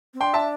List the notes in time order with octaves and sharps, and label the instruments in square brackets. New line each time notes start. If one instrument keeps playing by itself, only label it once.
[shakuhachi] C4
[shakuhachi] D4 [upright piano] G5 C6
[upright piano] E5 A5